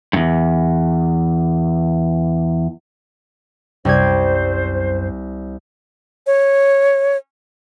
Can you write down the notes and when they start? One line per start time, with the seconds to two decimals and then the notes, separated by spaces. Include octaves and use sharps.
0.13 E2 G2
3.85 C2 F#2 G3 C5 G#6
6.27 C#5